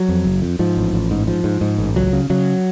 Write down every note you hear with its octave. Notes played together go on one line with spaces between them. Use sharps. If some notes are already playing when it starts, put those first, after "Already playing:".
Already playing: F#3
F2
F#1
F2
G#2 F3
A1
A1
G#2
G#2 F3
G#2
G#2
A1
C#2 F#3
C#3
C#3 F#3